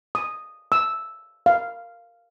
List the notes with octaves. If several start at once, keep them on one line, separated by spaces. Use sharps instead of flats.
D#6
E6
F5